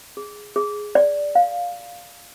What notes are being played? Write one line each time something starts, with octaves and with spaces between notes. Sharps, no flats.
G#4
G#4
D5
F5